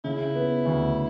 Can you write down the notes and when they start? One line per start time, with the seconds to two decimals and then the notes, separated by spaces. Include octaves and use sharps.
0.04 C#3 E4
0.35 B3
0.66 D2